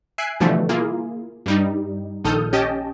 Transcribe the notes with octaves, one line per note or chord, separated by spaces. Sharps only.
E5 G#5 F#6 C7 D7
B2 D3 E3 F3 G3 A3
A#3 E4 F4 G#4
G2 G3 D#4
A#1 D#3 A4 D#6 F6 G6
C#4 G4 D#5 G5 A5